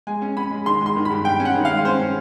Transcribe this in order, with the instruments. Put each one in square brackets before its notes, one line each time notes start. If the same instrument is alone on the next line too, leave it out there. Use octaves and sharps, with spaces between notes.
[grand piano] G#3 G#5
C#4
C#4 B5
G#3
D#3 C6
G#3
C6
D#3
B5
G2
G2 G5
C#4
F#5
D#3
F5
G#3
C#4 C5
C#4